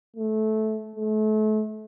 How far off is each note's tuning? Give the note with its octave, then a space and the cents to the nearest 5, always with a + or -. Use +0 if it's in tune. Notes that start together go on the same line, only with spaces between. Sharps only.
A3 -15
A3 -35